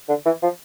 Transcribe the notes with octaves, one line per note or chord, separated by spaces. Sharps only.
D3
E3
F3